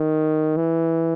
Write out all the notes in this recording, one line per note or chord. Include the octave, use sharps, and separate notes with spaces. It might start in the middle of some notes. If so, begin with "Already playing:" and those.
Already playing: D#3
E3